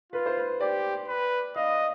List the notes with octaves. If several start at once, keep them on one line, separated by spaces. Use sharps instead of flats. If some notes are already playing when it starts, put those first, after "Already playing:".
F4 B4
C5
B4
G4 D5
B4
D#5 F5